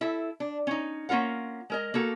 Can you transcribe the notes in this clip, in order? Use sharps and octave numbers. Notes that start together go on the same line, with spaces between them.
E4 A4 E5
D4
C#4 D#4
A#3 C#4 F4 A#4 F#5
G#3 A#4 D#5
A#3 F#4 A4 A#4